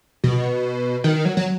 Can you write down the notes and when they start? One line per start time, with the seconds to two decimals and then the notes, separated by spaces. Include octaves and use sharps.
0.24 B2
1.04 D#3
1.25 F#3
1.37 F#3